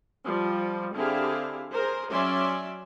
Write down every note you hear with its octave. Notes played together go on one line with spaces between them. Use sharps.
F3 G3
D3 C4 E4 G4 G#4 F5
G#4 A#4 C5
F#3 C#4 D5 E5 C6